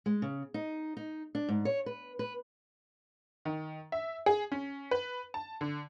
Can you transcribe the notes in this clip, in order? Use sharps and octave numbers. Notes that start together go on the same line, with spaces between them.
G#3
C#3
D#4
D#4
D4
G#2
C#5
B4
B4
D#3
E5
G#4
C#4
B4
A5
D3